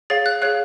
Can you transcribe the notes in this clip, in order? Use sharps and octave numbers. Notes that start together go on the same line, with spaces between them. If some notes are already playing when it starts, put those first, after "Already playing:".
G#4 C#5 F5 A6
F#6
G#4 C#5 F5 F#6